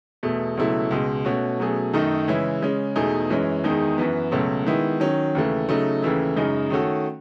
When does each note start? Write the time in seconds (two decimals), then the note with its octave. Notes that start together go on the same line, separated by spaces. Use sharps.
0.23 E2 B2 A3
0.57 C#2 B2 F#3 A3 E4
0.91 C#2 B2 G#3
1.25 B2 A3 C#4 F#4
1.59 B2 F#3 A3 C#4 G#4
1.93 F#2 D#3 A3 D#4 A4
2.28 C#3 E3 G#3 C#4 E4
2.62 C#3 G#3 C#4
2.96 E2 B2 A3 D#4 G#4
3.30 F#2 E3 G#3 C#4
3.64 E2 D#3 G#3 D#4 G#4
3.98 F#2 E3 B3
4.32 C#2 B2 F#3 A3 C#4
4.66 D#3 G#3 B3 E4
5.00 D#3 F#3 C#4
5.35 D#2 C#3 E3 A3
5.69 C#3 F#3 A3 D#4
6.02 D#2 C#3 E3 A3 E4
6.36 F#2 C#3 G#3 D#4
6.70 D#3 A3 C#4 F#4 A4